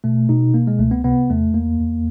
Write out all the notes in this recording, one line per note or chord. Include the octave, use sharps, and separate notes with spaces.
B2 A3
B2 D#4
B2 A#3
G#3
C#2 A3
B3
C3 B3
E2 A3
E2 A#3
E2